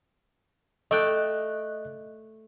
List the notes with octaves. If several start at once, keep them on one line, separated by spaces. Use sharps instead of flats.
A3 D5 D#5 G5 F#6